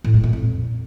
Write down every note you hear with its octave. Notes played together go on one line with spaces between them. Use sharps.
A2
G#3
A#2
F2